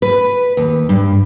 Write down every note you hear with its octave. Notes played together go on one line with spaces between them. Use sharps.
B4
D#2
G2